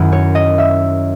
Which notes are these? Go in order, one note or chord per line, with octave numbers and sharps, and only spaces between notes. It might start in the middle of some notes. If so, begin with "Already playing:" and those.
Already playing: F#2 D#3 F#3 C#4 E4
C#5
D#5
E5